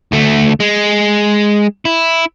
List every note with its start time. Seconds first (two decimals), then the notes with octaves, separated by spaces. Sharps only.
0.12 D2 A3
0.60 G#3
1.85 E4